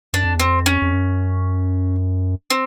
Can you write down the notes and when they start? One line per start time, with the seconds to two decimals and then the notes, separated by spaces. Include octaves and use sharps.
0.13 F#2 D4
0.24 F2
0.35 E2 C4
0.45 F2
0.66 C#4
0.82 F2
0.93 F#2
2.50 C4